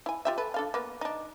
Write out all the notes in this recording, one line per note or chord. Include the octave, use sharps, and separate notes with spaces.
E4 G#5
F4 G4 E5
A4 B4
D4 A4 F5
A#3 B3
D4 D#4